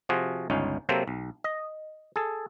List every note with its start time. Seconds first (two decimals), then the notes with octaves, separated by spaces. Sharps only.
0.09 C3 F3 F4 F#4 G#4
0.50 G1 C#2 C#4 D#4
0.89 C3 F#3 A#3 C4 A4 C5
1.08 B1
1.44 D#5
2.16 G#4 A4